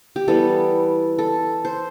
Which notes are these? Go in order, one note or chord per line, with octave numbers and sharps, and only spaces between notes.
G4
E3 G3 B3 A4
A4
C5